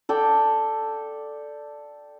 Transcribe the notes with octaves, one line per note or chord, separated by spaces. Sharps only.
A4 D5 G5